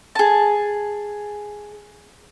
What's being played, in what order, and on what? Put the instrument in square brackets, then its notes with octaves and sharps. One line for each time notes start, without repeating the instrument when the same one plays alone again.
[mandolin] G#4 A5